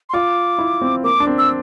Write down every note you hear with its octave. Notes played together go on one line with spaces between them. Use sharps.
C6
F4 D6
E4
C4
A#3 D6
D4
C4
E6